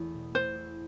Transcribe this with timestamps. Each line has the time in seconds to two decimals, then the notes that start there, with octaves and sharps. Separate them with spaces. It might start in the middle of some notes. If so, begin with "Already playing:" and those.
Already playing: E2 A3 E4
0.14 B2
0.34 A3 C5
0.55 E4